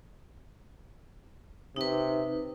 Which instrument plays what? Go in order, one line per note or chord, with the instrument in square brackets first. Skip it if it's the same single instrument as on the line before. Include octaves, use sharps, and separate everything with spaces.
[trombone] C3 [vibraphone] D#4 B4